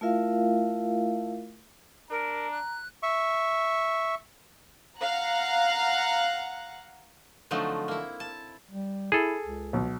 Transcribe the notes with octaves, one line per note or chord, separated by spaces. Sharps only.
A3 E4 F4 A#4 E5 F5
D4 A#4 A#5
F#6
E5 C#6
F5 F#5 A#5 F#6
D3 F3 F#3 A3 C4 D#4
A#3 E4
A5
G3
E4 G#4 A4
C#2
B1